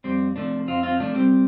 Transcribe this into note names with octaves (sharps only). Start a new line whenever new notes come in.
F2 G3 C4
C3 F3 A3 D4
F2 C4 F4
C4 F4
C3 F3 A3 D4
G3 C4